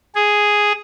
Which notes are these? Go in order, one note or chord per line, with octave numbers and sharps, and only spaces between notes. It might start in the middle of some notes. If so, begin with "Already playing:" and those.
G#4